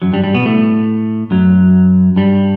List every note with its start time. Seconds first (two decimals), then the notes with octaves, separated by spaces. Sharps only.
0.02 F#2 F#3
0.13 G2 G3
0.24 G2 G3
0.35 B2 B3
0.45 A2 A3
1.31 F#2 F#3
2.16 G2 G3